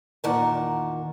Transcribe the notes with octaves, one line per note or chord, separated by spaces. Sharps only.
E2 A#2 D#3 A#4 F#5 A5